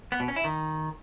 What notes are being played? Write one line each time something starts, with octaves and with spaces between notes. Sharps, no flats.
B3
B2
C#4
E4
D#3